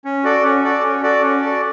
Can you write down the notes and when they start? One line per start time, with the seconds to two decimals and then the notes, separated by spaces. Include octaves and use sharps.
0.05 C#4
0.24 F#4 A4 D5
0.44 C#4
0.64 F#4 A4 D5
0.83 C#4
1.03 F#4 A4 D5
1.22 C#4
1.42 F#4 A4 D5